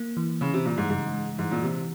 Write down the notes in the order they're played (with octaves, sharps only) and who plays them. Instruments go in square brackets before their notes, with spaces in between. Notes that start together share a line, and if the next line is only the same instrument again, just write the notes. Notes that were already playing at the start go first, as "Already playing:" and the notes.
Already playing: [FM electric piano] A#3
E3
[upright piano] C#3 [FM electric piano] E3
[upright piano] C3
[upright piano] A#2 [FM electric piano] E3
[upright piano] G#2
[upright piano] G#2 [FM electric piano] C#3
[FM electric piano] G#3
[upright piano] G#2 [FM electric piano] E3
[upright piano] A#2
[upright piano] C3 [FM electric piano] E3